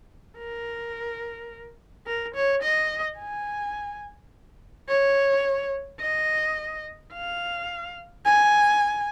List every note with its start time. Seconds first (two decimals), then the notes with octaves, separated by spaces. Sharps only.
0.38 A#4
2.07 A#4
2.35 C#5
2.62 D#5
3.19 G#5
4.89 C#5
6.01 D#5
7.13 F5
8.25 G#5